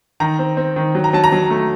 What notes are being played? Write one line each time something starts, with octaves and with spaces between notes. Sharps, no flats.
D#3 A#5
C4
C4
D#3
F#3
A#5
F#3 A5
A#5
F#3
A3